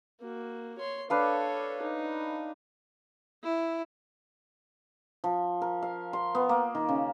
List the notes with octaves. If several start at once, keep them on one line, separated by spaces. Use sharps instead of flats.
A#3 F#4
C#5 C6
D4 A4 B4 C#5 F5
D#4
E4
F3
A#4
F5
C6
B3
A#3
D#3
C#3